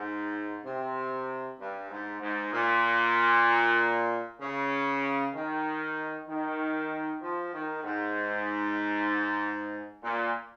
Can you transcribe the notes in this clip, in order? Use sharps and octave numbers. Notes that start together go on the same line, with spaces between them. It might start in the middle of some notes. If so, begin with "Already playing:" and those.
Already playing: G#2
C3
G2
G#2
G#2
A#2
C#3
D#3
D#3
F3
D#3
G#2
A#2